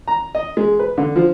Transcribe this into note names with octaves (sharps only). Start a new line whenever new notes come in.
A#5
D#5
G#3
B4
D3
F3